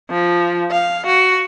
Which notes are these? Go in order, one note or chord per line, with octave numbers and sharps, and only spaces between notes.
F3
F5
F#4